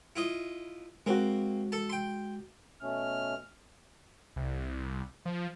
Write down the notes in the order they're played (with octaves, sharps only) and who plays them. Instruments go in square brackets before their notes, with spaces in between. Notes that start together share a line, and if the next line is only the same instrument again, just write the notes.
[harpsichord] E4 F4 D#5
[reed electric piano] G#3 F#4 [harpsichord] A#3 C4
[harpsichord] A4 A5
G5 C6
[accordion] B2 A3 C#4 [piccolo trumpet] F6
[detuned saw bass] C2
F3